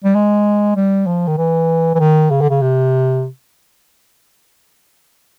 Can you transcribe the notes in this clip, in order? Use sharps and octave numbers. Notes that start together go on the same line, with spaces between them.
G3
G#3
G3
F3
D#3
E3
E3
D#3
C#3
D3
C#3
C3